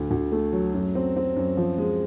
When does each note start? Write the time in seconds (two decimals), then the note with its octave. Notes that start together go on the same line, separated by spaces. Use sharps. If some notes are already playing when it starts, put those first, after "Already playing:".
Already playing: D2
0.11 D2
0.32 A3
0.53 F#3
0.74 F#2
0.95 C4
1.16 C4
1.36 F#2
1.57 F3
1.78 G#3